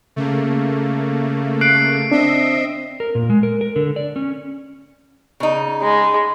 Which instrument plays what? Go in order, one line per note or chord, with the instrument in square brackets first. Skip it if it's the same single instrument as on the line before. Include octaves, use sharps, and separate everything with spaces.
[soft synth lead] C#3 [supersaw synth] A3 A#3
[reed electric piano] F#6 [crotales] C7 D7
[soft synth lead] C4 [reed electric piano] D4 [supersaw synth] D#5 E5
[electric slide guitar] A#4
A#2
G#3
A#4
A#4
D3
D5
C#4
[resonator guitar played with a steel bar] C#3 D#4
[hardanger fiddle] G#3